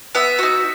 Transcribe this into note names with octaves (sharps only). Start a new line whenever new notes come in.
B3 E5
D#4 F#4